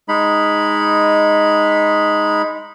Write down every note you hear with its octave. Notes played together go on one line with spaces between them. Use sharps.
G#3 D#4 B5